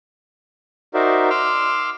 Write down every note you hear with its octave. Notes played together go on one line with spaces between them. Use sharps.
D#4 F#4 A#4 C5 D5 E5
C6 D6 E6 F6